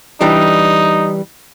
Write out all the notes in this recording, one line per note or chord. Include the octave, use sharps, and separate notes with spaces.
E3 G3 D4 D#4